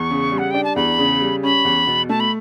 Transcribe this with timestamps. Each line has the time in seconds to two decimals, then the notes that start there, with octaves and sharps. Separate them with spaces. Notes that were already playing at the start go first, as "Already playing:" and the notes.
Already playing: E2 C#6
0.10 C#3
0.32 G3
0.38 F#5
0.51 D4 G5
0.64 A5
0.76 E2 B5
0.98 C#3
1.21 G3
1.43 C#4 B5
1.65 E2
1.87 B2
2.09 A3 A5
2.20 B5